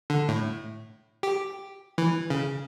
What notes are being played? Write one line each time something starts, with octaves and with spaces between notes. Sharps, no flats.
D3
A2
G4
E3
C#3